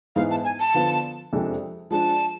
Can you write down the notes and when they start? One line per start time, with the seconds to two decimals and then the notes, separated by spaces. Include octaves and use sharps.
0.16 G#2 E3 G#3 B3 F5
0.31 A5
0.45 G#5
0.60 A5
0.74 D3 F3 B3 F4
1.33 F2 C3 G#3 D4 A4
1.91 F3 G#3 D4 A5